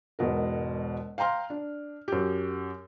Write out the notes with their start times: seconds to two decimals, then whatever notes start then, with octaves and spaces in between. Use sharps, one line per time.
0.19 E1 G#2 B2 A#4
1.18 F5 G5 A#5 C6 F6
1.50 D4
2.08 F#2 G4